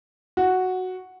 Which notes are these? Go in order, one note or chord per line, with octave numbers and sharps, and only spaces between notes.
F#4